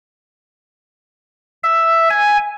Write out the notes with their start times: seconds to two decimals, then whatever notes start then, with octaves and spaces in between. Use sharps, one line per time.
1.63 E5
2.10 G#5